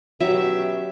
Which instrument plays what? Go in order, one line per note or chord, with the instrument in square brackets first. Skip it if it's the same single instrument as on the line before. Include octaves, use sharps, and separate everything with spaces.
[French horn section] B2 C#4 G4 [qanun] F#3 [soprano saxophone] E5